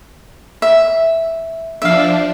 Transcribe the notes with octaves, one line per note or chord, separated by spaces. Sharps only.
E5
F3 D4 E5 F5